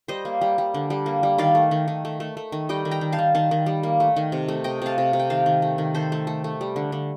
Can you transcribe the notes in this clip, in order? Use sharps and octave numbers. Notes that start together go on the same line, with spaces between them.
G3 C5 D#5
A#3
G3
G3
D3
G3
A#3
G3
D#3 D5 F5
A3
D#3
D#3
A3
A3
A3
D#3
G3 D#5 G5
D#3
G5 A#5
D#3
F5 A5
D#3
D#3 F5 A5
D#3
G3
A#3
A3
D#3
C3
A3
C3 D#5 G5
C3 F5 A5
C3
C3
G5
D#3 F5 A5
D#3
A3
D#3
D#3 A4 C5
A3
A3
A3
G3
D3
D3